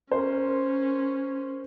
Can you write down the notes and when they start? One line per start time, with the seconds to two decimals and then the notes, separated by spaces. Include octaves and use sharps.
0.11 C#4 A#4 C5